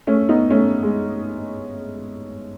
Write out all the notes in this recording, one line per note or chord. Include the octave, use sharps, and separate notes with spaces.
A3 C#4
B3 D#4
A3 C#4
G#3